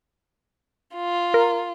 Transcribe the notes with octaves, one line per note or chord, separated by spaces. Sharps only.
F4
A#4